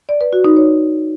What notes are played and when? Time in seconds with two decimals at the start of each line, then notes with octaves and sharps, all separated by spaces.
0.09 D5
0.21 B4
0.33 F#4
0.45 D#4
0.56 C#5